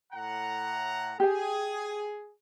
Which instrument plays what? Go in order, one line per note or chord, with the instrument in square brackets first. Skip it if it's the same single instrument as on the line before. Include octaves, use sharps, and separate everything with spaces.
[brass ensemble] A2 F#5 A#5
[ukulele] G4 G5 [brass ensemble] G#4